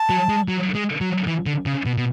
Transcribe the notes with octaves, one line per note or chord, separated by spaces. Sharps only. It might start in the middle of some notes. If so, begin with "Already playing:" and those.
Already playing: A5
F#3
G#3
F#3
G#3
F#3
E3
D3
C#3
B2
B2